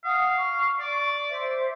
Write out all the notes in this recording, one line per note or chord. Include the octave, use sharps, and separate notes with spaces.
F5 F#5 D#6
C#6
D5
C5 E5